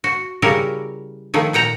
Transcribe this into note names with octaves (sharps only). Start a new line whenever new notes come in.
F#4
C#3 G3 E4 F#4 A#4
D#3 F3 A3
A#2 F#5 G5 A#5